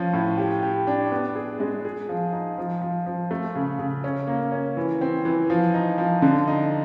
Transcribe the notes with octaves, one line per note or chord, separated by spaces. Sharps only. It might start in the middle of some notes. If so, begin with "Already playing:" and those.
Already playing: F3 C#4
A2
G4
G4
D4
B3
G#4
G#3
G#4
F3
D#4
F3
F3
F3
A3
C#3
C#3
C#4
A#3
C#4
E3
C4
E3
F3
D#4
F3
D3
D#4